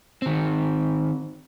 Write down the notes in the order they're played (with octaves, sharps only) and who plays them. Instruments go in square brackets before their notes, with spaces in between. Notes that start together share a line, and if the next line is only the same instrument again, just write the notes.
[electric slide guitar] D#3 C4